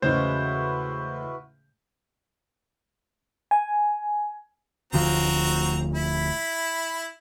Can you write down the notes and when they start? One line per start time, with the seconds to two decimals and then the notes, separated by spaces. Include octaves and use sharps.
0.02 E2 A2 C#3 G#3 E4 F#4 B4 C5
3.51 G#5
4.93 D1 D2 F3 C4 F#4 A#5
5.95 E4 B5